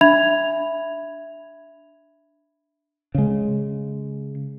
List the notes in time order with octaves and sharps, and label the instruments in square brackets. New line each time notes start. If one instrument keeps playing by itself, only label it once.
[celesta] D4 E5 B5 G#6 F7
[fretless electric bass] C#3 G#3